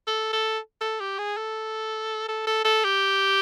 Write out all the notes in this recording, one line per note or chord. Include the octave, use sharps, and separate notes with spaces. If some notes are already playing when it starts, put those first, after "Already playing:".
A4
A4
A4
G4
G#4
A4
A4
A4
A4
G4